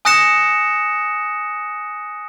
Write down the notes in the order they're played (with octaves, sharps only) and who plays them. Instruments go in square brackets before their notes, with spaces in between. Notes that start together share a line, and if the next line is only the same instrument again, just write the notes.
[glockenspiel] G#5 D#6 F#6 A#6 C#7 E7